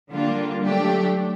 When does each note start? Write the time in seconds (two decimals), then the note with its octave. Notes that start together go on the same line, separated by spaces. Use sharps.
0.10 D3 G3 A#3 D4 F4
0.63 F#3 A3 D4 G4